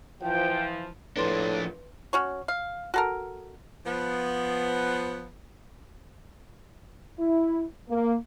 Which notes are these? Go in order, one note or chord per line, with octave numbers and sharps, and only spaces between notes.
E3 F3 G5
A2 F3 D4 B4 C6
C#4 F#4 C#5
F5
F#4 A4 A#4
F3 B3
E4
A#3